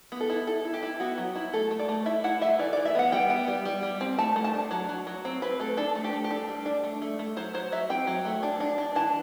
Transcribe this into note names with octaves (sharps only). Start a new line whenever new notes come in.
B3
A4
E4
E4 A4
E4
G4
E4
B3 F#4
F#3
E4
A3 A4
A3
D5
A3
E4 E5
E4 F#5
A3 E5
E3 D5
E3 D5
E5
B3 F#5
G3 G5
B3
G3
G3
G3
C4
A3 A5
A3
A5
D4
F#3
F#3
F#3
C4
C4 B4
A3 A4
D4 A4
A3
G4
A3
G4
D4 A4
G3
D4
A3
A3
A3
F#3 C5
F#3 C5
F#3 E5
C4 G5
F#3
A3
D4
D4
D4
E3 A5